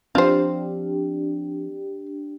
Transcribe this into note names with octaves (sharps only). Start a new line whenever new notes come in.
F3 C4 D4 F4 G4 C5